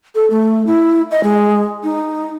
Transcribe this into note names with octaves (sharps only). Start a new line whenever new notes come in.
A4
A3
E4
D#5
G#3
D#4